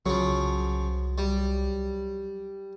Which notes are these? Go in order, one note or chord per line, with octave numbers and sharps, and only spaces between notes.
C2 C#3 F3 F#3
G3